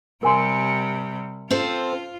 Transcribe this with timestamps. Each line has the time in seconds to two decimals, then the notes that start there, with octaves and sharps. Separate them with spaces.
0.23 C3 G3 A#4 G#5 C6
1.50 C4 F4 A4 C5